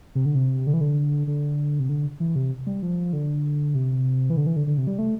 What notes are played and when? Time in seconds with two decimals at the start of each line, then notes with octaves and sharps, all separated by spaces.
0.15 C3
0.25 D3
0.35 C3
0.67 D3
0.74 E3
0.81 D3
1.27 D3
1.80 C3
1.89 D3
2.20 E3
2.36 C3
2.67 G3
2.82 F3
3.13 D3
3.75 C3
4.30 E3
4.37 D3
4.46 E3
4.56 D3
4.67 D3
4.78 C3
4.87 G3
4.98 A3